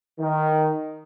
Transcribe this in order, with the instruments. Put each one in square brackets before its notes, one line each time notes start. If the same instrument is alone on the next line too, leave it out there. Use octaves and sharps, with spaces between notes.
[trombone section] D#3